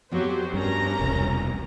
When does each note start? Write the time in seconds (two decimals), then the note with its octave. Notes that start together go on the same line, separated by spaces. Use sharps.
0.11 F2 F#3 B3 G4 C5
0.54 G2 C#4 A#4 A#5
0.99 E1 C2